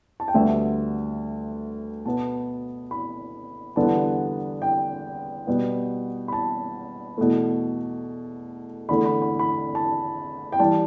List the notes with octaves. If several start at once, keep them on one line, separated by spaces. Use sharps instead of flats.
A5
G5
D2 D3 G3 B3 E5
B2 B3 A5
B5
E2 D3 G3 B3 A5
G5
B2 G3 B3
B5
A5
E2 B2 A3
E2 D3 A3 B5
B5
B5
B5
A5
G5
E3 G3 A5